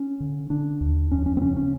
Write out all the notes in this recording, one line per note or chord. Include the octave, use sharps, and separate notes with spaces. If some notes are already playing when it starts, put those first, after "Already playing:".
Already playing: C#4
D3
D3 D4
D#2
F2 C#4
C#4
C4
C#3 C#4
C#4